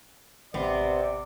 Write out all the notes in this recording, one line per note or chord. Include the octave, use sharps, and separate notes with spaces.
A1 C3 B3 C4 D5